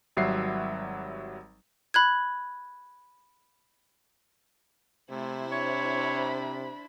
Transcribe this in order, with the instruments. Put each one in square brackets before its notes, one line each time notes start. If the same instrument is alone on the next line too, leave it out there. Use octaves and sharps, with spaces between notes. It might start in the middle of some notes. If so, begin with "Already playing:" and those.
[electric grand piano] G#1 F#3 G3 E5 F#5 C7
[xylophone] B5 F#6 G#6
[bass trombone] C3 [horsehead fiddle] A3 [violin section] E4 C5
[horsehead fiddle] D4 B5 [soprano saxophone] C#5